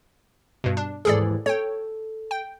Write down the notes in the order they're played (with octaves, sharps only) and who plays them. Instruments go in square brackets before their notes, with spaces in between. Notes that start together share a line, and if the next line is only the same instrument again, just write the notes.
[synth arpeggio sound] G2 B2
D4
[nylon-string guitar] D#2 G#2 E3 [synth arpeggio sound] G#4 A4 D5
[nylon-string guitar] A4 [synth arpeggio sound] C#5 G5
[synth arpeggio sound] G5